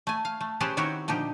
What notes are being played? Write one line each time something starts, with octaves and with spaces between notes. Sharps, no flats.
A3 G#5
F5
A3
C#4 G4 G#4 B4 C5 A5
D#3 C4 E4 F#4 G4 C#5
A#2 D3 F3 D#4 G4